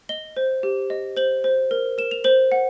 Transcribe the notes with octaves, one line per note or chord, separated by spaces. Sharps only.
D#5 G7
C5
G4
D#5
C5 F#7
C5
A#4
A#4 E7
F7
C5 F#7
F#5